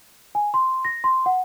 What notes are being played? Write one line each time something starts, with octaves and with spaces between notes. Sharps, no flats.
G#5
C6
A#6
C6
F#5